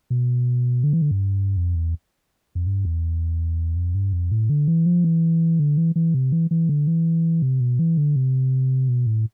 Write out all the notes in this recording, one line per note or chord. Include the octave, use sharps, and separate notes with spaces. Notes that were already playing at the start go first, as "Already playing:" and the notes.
B2
D3
E3
D3
G2
F2
E2
F2
G2
E2
F2
G2
F2
A2
D3
E3
F3
E3
D3
E3
E3
C3
E3
E3
D3
E3
C3
B2
E3
D3
C3
B2
A2